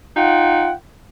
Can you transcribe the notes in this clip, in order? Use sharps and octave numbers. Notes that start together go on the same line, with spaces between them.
D#4 F4 F#5 G5